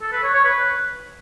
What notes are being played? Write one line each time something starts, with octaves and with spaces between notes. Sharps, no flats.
A4
B4
C#5
C#5
B4